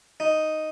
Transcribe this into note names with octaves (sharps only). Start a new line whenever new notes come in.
D#4